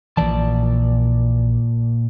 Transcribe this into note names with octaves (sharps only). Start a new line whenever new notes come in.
A#1 A#2 E3 D5 A5